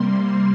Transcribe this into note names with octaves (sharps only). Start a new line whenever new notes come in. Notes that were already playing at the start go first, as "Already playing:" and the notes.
Already playing: C3 G3 A#3 C6